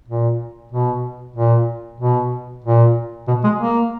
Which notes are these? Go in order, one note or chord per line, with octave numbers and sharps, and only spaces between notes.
A#2
B2
A#2
B2
A#2
B2
G#3
A#3